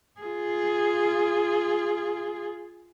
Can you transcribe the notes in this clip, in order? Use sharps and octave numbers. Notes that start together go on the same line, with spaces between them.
F4 G#4